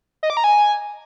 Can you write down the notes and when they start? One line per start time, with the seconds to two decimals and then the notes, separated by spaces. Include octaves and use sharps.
0.23 D#5
0.30 D6
0.37 A#5
0.44 G#5